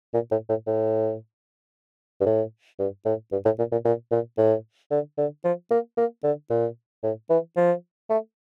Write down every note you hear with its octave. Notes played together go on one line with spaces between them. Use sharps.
A#2
A2
A2
A2
G2
A2
G2
A2
G2
A2
A#2
A#2
A#2
A#2
A2
D3
D3
F3
A#3
A#3
D3
A#2
A2
E3
F3
A3